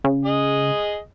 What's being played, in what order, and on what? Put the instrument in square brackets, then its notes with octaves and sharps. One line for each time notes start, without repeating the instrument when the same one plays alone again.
[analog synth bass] C#3
[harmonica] G#4 D#5